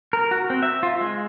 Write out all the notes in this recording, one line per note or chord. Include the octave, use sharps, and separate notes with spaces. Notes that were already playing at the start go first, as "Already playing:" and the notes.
A#4
F#4
C4
E5
F4
G#3